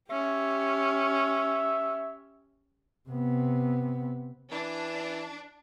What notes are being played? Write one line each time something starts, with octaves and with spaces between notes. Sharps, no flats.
C#4 G4 E5
C3 B3
E3 D4